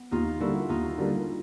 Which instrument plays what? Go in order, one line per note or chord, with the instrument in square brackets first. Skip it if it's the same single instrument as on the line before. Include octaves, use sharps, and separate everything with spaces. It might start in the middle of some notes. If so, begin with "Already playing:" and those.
Already playing: [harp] B3
[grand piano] D#2 [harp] D#4 F4
[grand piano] D3 G3 A#3 [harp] E4 F#4
[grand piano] D#2 [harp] D#4 F4
[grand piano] D3 G3 A#3